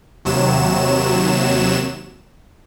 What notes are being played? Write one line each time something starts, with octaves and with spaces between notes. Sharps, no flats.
D#2 C3 F#3 E7